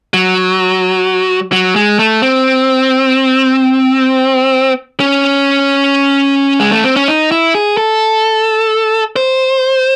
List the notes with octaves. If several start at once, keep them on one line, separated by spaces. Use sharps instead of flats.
F#3
F#3
G#3
A3
C4
C#4
G#3
A3
C4
C#4
D#4
E4
G#4
A4
C5